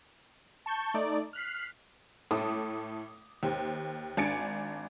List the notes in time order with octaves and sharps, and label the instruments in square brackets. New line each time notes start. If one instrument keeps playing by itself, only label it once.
[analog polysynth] A5 C#6 G6
A3 D#4 D5
F6 F#6 B6 C7
[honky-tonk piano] A2 A3 A5 D6 D#6
D#2 G4 C5
G#1 D4 G#5 A6 C#7 D7